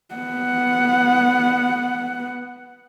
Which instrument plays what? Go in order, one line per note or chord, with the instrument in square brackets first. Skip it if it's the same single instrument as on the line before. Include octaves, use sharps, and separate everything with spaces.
[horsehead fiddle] B3 F#5